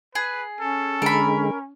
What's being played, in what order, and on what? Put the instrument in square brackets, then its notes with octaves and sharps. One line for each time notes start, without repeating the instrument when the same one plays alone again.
[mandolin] G#4 [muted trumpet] B4
[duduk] C#4 [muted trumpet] A4
[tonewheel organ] D3 G#3 [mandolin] A#4 B5